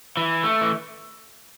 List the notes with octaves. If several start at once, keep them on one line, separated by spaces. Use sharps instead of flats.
E3
A3
E3